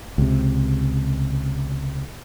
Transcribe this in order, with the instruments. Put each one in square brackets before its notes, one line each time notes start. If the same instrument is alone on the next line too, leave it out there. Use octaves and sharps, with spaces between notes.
[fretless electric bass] C#2 C3